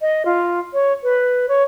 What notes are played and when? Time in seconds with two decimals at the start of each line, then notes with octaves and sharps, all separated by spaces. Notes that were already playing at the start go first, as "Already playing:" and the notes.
0.01 D#5
0.25 F4
0.74 C#5
1.03 B4
1.49 C#5